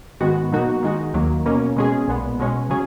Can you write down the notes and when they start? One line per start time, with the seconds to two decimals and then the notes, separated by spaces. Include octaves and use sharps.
0.20 G#2 D#3 G#3 B3 F#4
0.52 B2 F#3 A#3 D#4 F#4
0.83 D#3 G#3 D#4 F#4
1.14 D#2 D#3 F#3 A#3
1.46 B2 A#3 C#4
1.76 B2 G#3 C#4 G#4
2.08 B1 A#2 G#3 B3
2.39 B2 G#3 C#4
2.70 C#3 F#3 C#4 G#4